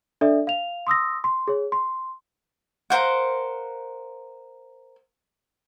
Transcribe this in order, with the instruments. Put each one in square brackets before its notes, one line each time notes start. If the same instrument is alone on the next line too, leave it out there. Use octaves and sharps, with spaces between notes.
[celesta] D4 A4 D5 E5
F5 F7
C6 D#6 E6 A#6
C6
G#4 C#5
C6
[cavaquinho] A#4 C5 F5 F#5